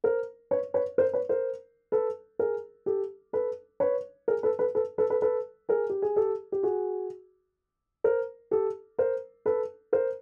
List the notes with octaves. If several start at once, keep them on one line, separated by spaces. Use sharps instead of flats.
A#4 C5
B4 C#5
B4 C#5
A#4 C5
B4 C#5
A#4 C5
A4 B4
G#4 A#4
G4 A4
A4 B4
B4 C#5
G#4 A#4
A4 B4
A4 B4
A4 B4
A4 B4
A4 B4
A4 B4
G#4 A#4
G4
G#4
G4 A4
G4
F#4 G#4
A#4 C5
G4 A4
A#4 C5
A4 B4
A#4 C5